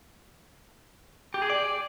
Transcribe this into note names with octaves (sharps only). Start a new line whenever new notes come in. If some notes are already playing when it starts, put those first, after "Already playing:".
G4
G#4
D5